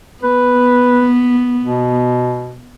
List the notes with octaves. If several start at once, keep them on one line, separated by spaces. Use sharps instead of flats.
B3 B4
B2